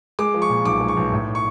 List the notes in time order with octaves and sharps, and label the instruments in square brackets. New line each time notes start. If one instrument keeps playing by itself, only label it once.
[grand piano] G#3 D6
F3
C#6
A#2
B1 D6
G#3
C#6
B1
A2
C#6